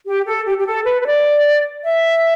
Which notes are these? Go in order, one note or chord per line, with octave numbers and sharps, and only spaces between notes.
G4
A4
G4
G4
A4
B4
B4
D5
E5